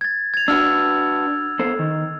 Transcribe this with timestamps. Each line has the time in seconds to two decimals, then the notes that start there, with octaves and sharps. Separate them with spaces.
0.01 G#6 A6
0.34 G#6 F7
0.48 D4 F#4 B4 E6 F6
1.59 B3 A4 C5
1.79 D#3